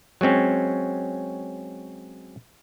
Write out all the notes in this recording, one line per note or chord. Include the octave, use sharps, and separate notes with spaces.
F#3 G#3 C4 C#4